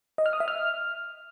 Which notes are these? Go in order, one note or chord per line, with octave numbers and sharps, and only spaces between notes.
D#5
F6
D#6
E5
F6